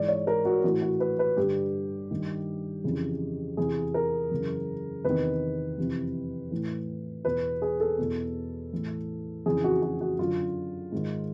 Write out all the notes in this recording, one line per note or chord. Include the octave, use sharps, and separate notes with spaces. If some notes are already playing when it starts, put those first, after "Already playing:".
Already playing: G#2 E3 D5
C#5
A#4
F#4
A2 E3 F#4
F#4
B4
B4
G2 D3 G4
G2 D#3
F2 C#3 E3
E2 C3 E3 G#4
A#4
F#2 C#3 E3
E2 C3 D#3 B4
F2 C3 E3
A2 E3
E2 B2 B4
G#4
A4
E2 B2
A2 E3
F2 C#3 E3 G#4
F#4
F#4
F#4
F#2 D3 F4
G#2 D#3